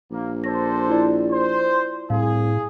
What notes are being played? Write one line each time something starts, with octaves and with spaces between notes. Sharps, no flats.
A#1 A#3
D4 A4 C5 A#6
E4 F4 D5
C5
C2 A2 G#4 F5